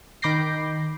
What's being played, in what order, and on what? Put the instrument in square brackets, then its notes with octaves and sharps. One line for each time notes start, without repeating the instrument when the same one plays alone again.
[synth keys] D#3 B5 D6 G6 A#6 C7